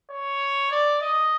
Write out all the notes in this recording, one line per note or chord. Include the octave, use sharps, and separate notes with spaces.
C#5
D5
D#5